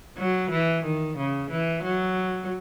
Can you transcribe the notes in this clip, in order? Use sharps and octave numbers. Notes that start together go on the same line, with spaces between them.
F#3
E3
D#3
C#3
E3
F#3